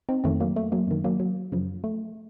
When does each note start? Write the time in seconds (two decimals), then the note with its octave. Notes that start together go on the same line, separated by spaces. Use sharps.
0.09 C4 D#4
0.24 F2 D#3 A3 C4
0.40 F#3 A#3
0.56 A3
0.72 F#3 A#3
0.87 F#2 D#3
1.04 F#3 A#3
1.20 F#3
1.52 F#2 C#3 F3
1.84 A3